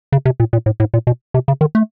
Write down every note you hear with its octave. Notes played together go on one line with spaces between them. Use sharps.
C#3
C3
A#2
A#2
A2
A2
A#2
B2
C3
C#3
D#3
A3